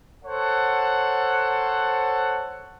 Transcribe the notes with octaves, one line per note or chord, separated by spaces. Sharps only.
A4 C5 C#5 F#5